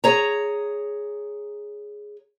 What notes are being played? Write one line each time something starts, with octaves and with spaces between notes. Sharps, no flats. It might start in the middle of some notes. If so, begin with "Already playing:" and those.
G#4 C#5 A#5